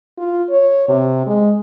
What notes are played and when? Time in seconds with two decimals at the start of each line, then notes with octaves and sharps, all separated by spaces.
0.18 F4
0.50 C#5
0.88 C3
1.27 G#3